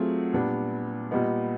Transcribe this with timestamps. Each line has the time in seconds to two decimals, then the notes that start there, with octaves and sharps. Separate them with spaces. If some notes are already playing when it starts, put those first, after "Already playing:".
Already playing: F#3 A3 C4 F4 G#4
0.33 A#2 G3 B3 D4
1.11 A#2 G3 B3 D#4